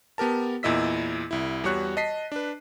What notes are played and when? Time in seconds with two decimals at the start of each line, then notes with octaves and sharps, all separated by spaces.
0.18 B3 G4 A#4 A5
0.63 E2 A#2 E4 D#5 E6 B6
1.31 C2 E4
1.64 E2 G3 F#4 C#5 C#6 F#6
1.97 D#5 A5 B6 C7
2.32 D4 B4